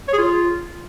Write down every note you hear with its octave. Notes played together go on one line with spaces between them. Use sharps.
C#5
G#4
F4